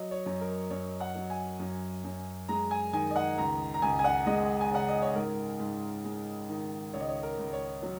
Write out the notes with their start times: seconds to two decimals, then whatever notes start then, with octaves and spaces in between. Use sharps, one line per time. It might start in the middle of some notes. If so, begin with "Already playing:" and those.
Already playing: F#3 D#5
0.11 C#5
0.26 F#2
0.41 A#4
0.70 F#2 C#5
1.00 F#5
1.15 F#3
1.30 G#5
1.60 F#2
2.04 F#2
2.49 G#3 A#5
2.71 G#5
2.93 D#3 G#5
3.11 D#5
3.16 F#5
3.38 C#2 A#5
3.74 A#5
3.82 C#2 G#5
3.99 G#5
4.04 F#5
4.27 G#3 D#5
4.61 G#5
4.71 C#3 F#5
4.88 D#5
5.02 C#5
5.15 G#2 A#4
5.60 G#2
6.05 G#3
6.49 D#3
6.93 C#2 C#5
7.01 D#5
7.08 C#5
7.23 A#4
7.38 C#2
7.53 C#5
7.83 F#3